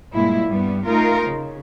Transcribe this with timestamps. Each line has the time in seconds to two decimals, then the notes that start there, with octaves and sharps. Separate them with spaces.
0.14 G2 A#2 G#3 E4
0.47 G2 G3 B3
0.86 A3 D#4 F4 A#4
1.25 C#3